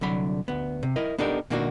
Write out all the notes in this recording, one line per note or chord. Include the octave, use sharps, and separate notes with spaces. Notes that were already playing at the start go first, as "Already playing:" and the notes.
C2 D3 F#3 B5
D2 B3
C3
E4 A#4 D#5
B3 D4 D#4 G4 A4 A#4
B2 D#3 A#3 D4 F4 F#4